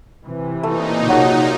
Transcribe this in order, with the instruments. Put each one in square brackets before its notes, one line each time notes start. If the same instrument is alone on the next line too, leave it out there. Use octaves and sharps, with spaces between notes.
[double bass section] C3 E3
[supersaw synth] A#2 D#4 [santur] A3
[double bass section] A#1 C3 [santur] F#3 F#4 G#4